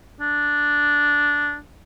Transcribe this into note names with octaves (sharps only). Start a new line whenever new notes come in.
D4